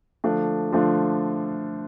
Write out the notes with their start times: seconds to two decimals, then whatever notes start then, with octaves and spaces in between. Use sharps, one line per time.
0.24 D3 F3 A3 D4 F4
0.72 D3 F3 A3 D4 F4